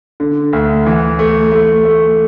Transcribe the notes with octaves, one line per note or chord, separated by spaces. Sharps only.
D3
D2
E3
A3
A3
A3